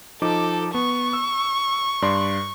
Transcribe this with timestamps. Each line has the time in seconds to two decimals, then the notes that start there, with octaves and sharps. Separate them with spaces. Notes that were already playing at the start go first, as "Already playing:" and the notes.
0.22 F3 D#4 A4 D6
0.74 B3 C#6
1.13 E6
2.02 G2 D5 C6